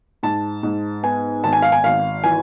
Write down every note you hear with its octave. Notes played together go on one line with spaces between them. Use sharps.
G#2 A5
G#2
B3 G#5
G#1 A5
G#5
F5
G#5
G#1 F5
E3 G#5